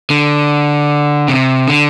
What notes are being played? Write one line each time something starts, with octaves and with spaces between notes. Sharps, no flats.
D3
C3
D3